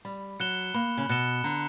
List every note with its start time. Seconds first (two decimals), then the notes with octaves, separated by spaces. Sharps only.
0.05 G3 B5
0.40 F#3 F#6 C#7 E7 G7
0.74 A#3 B5
0.98 C#3
1.09 B2 F#6 C#7 E7 G7
1.44 D3 A#5